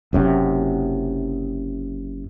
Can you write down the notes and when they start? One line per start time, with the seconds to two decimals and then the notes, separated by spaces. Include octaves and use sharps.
0.13 F#1 F#2 C3